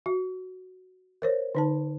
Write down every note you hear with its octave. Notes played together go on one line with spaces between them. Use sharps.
F#4
A#4 C5 C#5
D3 D#4 A5